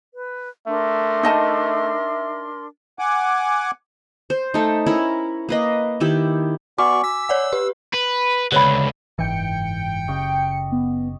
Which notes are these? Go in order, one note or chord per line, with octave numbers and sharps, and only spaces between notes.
B4
A3 D4 A#4 E5 C6
D#4 D#5 A5
F#5 G#5 D6
C5
A3 D#4
C#4 E4 A#4
A#3 B4 D#5
D#3 E4 G4
B3 F#4 D5 G#5 C#6 D6
E6 B6
C#5 D5 F#5
G4 B4
B4
C#2 D3 B4 C#5 B5
F#1 G#2 E3 G5 C#7
F#1 C#3 G4 D#5 C#6
B3